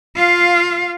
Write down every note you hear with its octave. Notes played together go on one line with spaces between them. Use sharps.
F4 F5